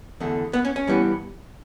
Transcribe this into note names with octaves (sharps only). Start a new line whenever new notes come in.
E2 D3 A3
B3
C#4
C#4
G2 E3 G3 B3